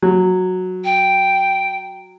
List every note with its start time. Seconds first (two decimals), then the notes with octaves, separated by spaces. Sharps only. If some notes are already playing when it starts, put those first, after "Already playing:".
0.02 F#3
0.84 G5